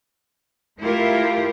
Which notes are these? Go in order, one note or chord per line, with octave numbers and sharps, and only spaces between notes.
A3 E4 F4 G4 A#4